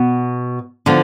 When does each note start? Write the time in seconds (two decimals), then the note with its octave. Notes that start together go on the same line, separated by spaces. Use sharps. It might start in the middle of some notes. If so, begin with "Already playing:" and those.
Already playing: B2 B3 F#4
0.86 D3 F3 B3